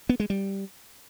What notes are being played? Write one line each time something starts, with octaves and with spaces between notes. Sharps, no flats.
B3
G#3
G3